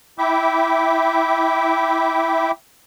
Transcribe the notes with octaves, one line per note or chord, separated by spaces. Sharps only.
E4 E5 G5 D6